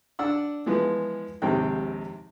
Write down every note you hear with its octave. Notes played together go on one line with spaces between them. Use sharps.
D4 F#5 E6
E3 F3 G#3 B3
A#1 D#2 G#2 C3 C4 G5